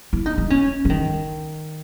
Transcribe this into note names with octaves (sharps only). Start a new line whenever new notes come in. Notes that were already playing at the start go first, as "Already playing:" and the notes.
E4
D#4
D#4
C#4
E3
D#3